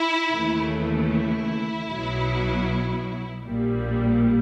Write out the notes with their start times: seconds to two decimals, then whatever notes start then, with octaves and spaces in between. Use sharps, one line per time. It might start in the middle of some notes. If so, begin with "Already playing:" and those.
Already playing: E4
0.32 D#2 C#3 E3 A3
1.10 E4
1.89 B1 B2 F#3
3.45 A#1 A#2 G3